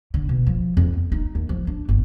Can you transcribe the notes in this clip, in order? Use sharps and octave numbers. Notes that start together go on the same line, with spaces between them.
D3
B2
F3
F2
B3
D#4
D#2
F3
D4
G1